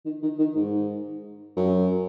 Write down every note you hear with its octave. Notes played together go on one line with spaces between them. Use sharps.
D#3
D#3
D#3
G#2
F#2